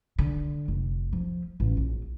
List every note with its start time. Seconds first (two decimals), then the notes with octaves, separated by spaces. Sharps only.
0.19 D3
0.68 F1
1.13 F3
1.60 A1
1.77 A#1